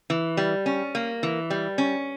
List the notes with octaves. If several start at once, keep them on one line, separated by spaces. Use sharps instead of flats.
E3
G3
C#4
A#3
E3
G3
C#4